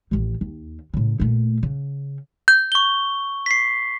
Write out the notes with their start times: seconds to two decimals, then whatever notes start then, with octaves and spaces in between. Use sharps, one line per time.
0.11 A1 D#3
0.41 D#2
0.94 A2 C#3
1.20 A#2 A3
1.63 C#3
2.48 G6
2.72 C#6 G7
3.46 B6 C7